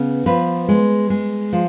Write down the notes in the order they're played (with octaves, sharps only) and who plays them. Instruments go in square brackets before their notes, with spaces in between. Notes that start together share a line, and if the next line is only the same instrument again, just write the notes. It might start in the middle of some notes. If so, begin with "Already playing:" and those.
Already playing: [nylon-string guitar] C#3 B3
F3 B4
G#3
G#3
F3